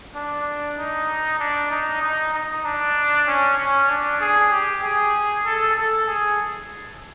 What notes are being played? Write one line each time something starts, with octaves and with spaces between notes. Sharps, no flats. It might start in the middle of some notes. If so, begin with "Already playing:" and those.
D4
D#4
D4
D#4
D#4
D#4
D4
C#4
C#4
D4
G#4
G4
G#4
A4
A4
G#4